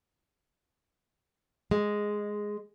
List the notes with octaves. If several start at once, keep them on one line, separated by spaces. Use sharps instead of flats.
G#3